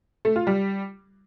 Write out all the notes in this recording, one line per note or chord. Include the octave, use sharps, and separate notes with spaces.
A3
F4
G3